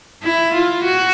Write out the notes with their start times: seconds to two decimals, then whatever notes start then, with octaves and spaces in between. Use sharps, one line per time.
0.23 E4
0.54 F4
0.84 F#4